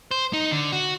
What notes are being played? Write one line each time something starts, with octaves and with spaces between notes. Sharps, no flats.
C5
D#4
D3
F#4